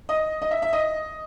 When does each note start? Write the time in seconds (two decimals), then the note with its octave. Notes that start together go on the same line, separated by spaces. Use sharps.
0.09 D#5
0.42 D#5
0.51 E5
0.62 E5
0.73 D#5